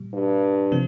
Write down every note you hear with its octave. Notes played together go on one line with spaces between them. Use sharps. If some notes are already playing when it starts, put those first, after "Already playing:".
Already playing: A#2 G3
G2
C3 F3 C4